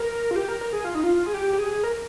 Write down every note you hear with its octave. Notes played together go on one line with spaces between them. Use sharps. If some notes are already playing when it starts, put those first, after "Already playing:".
Already playing: A#4
F4
G4
A#4
A#4
G#4
F4
D#4
F4
G#4
G4
G4
G#4
A#4